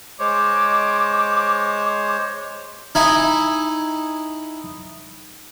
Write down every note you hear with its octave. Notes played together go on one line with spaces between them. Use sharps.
G#3 C5 C#5 D6
D#4 E4 G#5